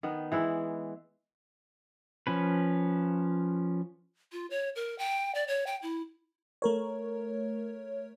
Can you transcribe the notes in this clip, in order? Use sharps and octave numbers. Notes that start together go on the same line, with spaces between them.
D#3 B3
E3 G#3 E4
F3 C#4 B4
F4
C#5
A#4
G5
D5
C#5
G5
E4
A3 A#4 C#5